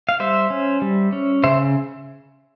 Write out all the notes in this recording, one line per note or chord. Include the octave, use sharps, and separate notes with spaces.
F5
G3 C5 E5
C#4
G3
C#4
C#3 C5 E5